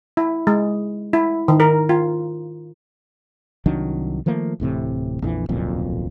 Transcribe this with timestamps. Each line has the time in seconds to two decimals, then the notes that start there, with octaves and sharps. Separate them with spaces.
0.17 E4
0.47 G#3
1.13 E4
1.48 D#3
1.60 A#4
1.89 F4
3.66 C2 D#3 F#3 D4
4.26 D#3 F3 A3 A#3
4.60 D1 A2 C3 E3
5.22 A#1 F2 E3
5.49 D1 B1 F2 A#2